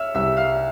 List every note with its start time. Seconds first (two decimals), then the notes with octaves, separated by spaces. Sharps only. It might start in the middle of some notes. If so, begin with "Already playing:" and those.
Already playing: C#5 E5 E6 F6
0.15 C2 E5 E6
0.37 F5 F6